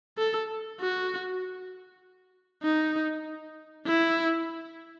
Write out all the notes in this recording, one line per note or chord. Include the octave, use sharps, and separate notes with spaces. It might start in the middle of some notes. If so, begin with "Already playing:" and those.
A4
F#4
D#4
E4